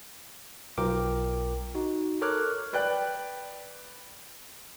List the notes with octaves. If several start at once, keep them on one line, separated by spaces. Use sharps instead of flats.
B1 F4 A#4 G5 D6
D#4 F#4
A4 A#4 C#5 D6 F6 F#6
B4 D5 G5 F#6